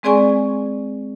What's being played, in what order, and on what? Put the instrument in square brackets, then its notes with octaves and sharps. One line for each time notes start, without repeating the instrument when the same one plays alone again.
[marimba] G#3 C4 G#4 D5 G#5 C#6